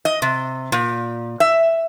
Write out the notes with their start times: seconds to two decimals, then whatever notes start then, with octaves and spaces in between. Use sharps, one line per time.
0.05 D#5
0.22 C3
0.72 A#2
1.40 E5